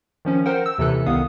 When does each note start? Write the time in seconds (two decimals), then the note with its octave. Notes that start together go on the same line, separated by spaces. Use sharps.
0.25 D#3 F3 C#4
0.46 A#4 C5 F#5 G5
0.66 E6
0.78 D#2 C3 E3 A4 F#6
1.06 C2 D#3 B3 F5 D#6